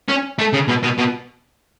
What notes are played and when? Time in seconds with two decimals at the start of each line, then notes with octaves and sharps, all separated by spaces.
0.08 C#4
0.39 A3
0.53 C#3
0.68 B2
0.83 B2
0.98 B2